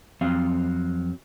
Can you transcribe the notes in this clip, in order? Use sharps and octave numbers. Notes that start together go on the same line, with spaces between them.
F2 F#3 C4 F5